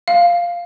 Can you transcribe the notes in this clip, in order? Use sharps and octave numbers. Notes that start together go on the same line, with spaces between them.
F5